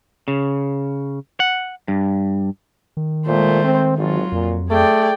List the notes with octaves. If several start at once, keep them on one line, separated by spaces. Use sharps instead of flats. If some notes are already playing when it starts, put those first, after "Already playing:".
C#3
F#5
G2
D#3
A#2 G#3 A3 C5
C4
G#1 F#3 F4
F2 A#2
A3 G#4 D5 G5